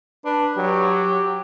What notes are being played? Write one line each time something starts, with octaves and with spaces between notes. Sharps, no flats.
D4 B4
F#3 G4